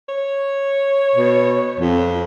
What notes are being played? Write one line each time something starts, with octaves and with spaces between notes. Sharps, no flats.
C#5
B2
F2